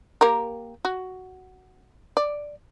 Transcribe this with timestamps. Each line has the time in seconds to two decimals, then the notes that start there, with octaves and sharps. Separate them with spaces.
0.21 A#3 G4 A#4
0.85 F#4
2.17 D5